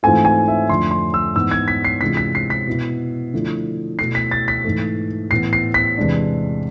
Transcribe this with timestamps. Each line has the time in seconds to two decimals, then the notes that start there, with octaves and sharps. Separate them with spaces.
0.03 G#2 E3 A3 C4 F4 G#5
0.25 G#5
0.48 E5
0.69 F2 D3 F3 A3 C6
0.91 C6
1.14 E6
1.36 G#2 E3 B3 E6
1.51 G#6
1.68 B6
1.85 C7
2.01 C3 E3 G#3 D4 F4 B6
2.17 B6
2.35 C7
2.50 B6
2.67 B2 B3 E4
3.33 D3 F3 A3 E4
3.99 B2 A3 E4 C7
4.15 B6
4.31 A6
4.48 B6
4.64 G#2 E3 A3
5.31 A2 E3 B3 C7
5.53 C7
5.74 B6
5.98 E2 C3 G#3 D4